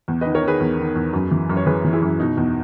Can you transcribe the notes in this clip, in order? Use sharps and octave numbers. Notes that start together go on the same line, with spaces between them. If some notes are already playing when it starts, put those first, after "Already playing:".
E2
D#3 B4 D#5
A#4 C#5
D#3 G#4 B4
E2
D#3
E2
F#2
E3
F#2
C#5
E3 G#4 B4
E3
E4 G#4
F#2
B2 D#4
E2